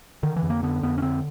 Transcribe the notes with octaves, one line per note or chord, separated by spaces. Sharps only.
D3 D#3
E3
F2
A#3
D3 B3
F2 B3
C#4
D3 C4